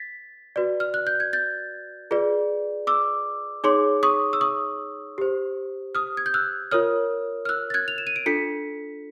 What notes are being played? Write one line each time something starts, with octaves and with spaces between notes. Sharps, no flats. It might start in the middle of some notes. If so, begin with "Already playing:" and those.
Already playing: A6 B6
F#4 B4 D5
F6
F#6
G6
G#6
G6 A6
F4 G#4 B4 D5
D6 E6
D#4 G#4 C#5 C6 D6
C#6 D#6
E6
C#6 D#6
G4 C5
D#6 F6
G#6
G6
E6 F#6
F4 A#4 C#5 D#6 F6
F6
E6 F#6
A6
F#6 G#6
F7
E7
D#7
D7
D4 F4 A4 B6 C#7